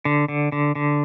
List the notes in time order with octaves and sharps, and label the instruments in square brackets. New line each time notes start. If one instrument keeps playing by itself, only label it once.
[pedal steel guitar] D3
D3
D3
D3